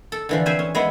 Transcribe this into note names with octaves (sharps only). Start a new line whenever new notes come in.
A4
D3 E3 F3
C4 C5 E5 G#5
C#4
G#3 B3 E4